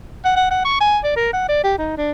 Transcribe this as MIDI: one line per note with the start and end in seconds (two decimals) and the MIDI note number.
0.25 0.33 78
0.36 0.49 78
0.51 0.64 78
0.65 0.80 85
0.81 0.98 80
1.04 1.13 74
1.16 1.31 70
1.33 1.44 78
1.49 1.63 74
1.63 1.73 67
1.78 1.97 63
1.98 2.12 62